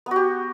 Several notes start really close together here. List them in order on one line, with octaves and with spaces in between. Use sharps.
B3 F#4 G4